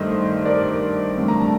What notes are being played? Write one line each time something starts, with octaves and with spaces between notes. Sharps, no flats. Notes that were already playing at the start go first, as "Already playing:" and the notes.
Already playing: G2 D#3 A3 C5 D#5
A#4 D5
A1 G2 D3 A3
A#5
A5